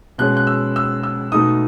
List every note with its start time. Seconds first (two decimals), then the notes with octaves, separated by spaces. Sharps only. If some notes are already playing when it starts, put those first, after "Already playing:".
0.18 B2 G#3 C#4 F#6
0.37 F#6
0.47 E6
0.76 E6
1.03 E6
1.32 B2 A3 D#4 D#6